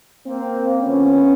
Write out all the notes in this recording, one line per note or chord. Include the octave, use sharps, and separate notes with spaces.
A#3 C4
D3 F3 A3 B3 C#4